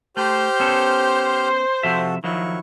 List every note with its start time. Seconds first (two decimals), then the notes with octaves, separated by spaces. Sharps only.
0.17 A3 G4 C5 F6 G6
0.60 B3 C#4 A4
1.83 C3 F3 F#4 A4 E5
2.24 D#3 F3 F#3 E4 C#6